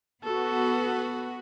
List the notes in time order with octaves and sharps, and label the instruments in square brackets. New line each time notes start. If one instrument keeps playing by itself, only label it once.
[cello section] B3 F#4 [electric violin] A4